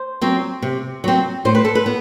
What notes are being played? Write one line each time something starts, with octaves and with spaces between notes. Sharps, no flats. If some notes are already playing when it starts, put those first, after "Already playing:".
Already playing: C5
F#3 C4
C3
F#3 C4
A2 C5
B4
A4
B4
B3